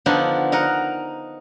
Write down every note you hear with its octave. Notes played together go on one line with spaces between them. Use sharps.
D3 F3 B3 D4 D#4
D#4 A#4 F#5